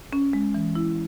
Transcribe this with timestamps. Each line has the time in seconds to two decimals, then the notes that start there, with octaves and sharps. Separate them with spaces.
0.13 C#4
0.33 G#3
0.54 E3
0.75 E4